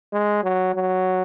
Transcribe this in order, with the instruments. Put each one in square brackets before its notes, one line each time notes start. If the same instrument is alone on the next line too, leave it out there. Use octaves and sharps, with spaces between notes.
[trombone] G#3
F#3
F#3